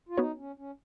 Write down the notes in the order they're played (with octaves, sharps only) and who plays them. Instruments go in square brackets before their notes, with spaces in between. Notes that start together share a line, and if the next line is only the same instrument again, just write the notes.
[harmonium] F4
[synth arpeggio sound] B3 F#4 C#5 [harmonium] D#4
[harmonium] C#4
C#4